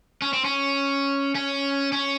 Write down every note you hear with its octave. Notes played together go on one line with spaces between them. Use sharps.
C#4
C4
C#4
C#4
C#4